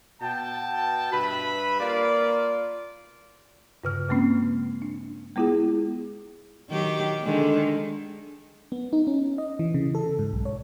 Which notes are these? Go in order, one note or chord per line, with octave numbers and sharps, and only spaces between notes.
B2 G5 A5
G2 B4 E5 B5
A#3 F4 D5
G2 C#3 F6
C#3 G#3 A#3 C4 C#4
D4
G#3 B3 E4 F4 G#4
D#3 F#3 G4
D3 D#3 G#3
B3
D#4
C#4
D#5
E3
C#3
A4
G#2
B1
C#5